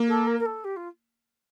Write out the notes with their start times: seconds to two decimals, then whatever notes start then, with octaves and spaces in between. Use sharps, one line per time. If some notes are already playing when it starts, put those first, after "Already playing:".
Already playing: A#3
0.08 A4
0.27 A#4
0.39 A#4
0.46 A4
0.64 G4
0.76 F4